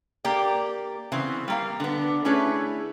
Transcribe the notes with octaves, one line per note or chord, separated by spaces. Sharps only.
A#3 G4 D5
C#3 E3 B3 C4 C5
G3 A#3 F5
D3 B3
A3 C#4 E4 G#4 B4 C#5